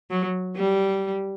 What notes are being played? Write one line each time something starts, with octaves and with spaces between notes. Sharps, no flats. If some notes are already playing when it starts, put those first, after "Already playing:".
F#3
G3